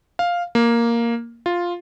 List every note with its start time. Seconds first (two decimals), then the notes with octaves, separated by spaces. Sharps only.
0.19 F5
0.55 A#3
1.46 F4